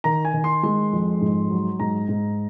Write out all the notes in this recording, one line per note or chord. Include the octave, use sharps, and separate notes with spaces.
D#3 A#5
G#5
D#3
C6
G#3 C6
F2
G#2
F#3
G#2 A#5
G#2